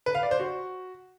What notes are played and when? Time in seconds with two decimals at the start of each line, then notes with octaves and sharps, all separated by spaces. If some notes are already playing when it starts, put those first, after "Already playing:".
0.06 B4
0.15 F5
0.23 D5
0.31 C5
0.40 F#4